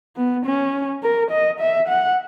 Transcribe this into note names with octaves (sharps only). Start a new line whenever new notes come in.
B3
C#4
A#4
D#5
E5
F#5